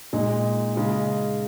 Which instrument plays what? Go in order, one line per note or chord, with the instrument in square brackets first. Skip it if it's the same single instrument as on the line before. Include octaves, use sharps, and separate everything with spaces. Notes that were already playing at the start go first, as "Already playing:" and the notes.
[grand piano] A#2 G#3 D#4
C#3 G#3 D#4